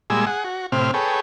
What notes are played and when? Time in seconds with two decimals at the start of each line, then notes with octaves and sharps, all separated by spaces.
0.10 A#2 G3 G#3 G#5 E6
0.27 G#4 F#5
0.44 F#4
0.72 A2 C3 C4 F6
0.94 G#4 A4 B4 C#5 G5